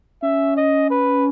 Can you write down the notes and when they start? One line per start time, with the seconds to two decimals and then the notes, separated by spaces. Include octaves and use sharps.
0.22 C#4 E5
0.57 D#5
0.91 B4